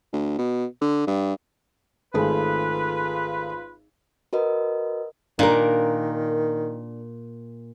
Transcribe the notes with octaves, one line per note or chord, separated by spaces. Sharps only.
D2
B2
D3
G2
G#1 A3 F4 G#4 B4
F#4 A#4 B4 D#5
A#2 D#3 D4 A#4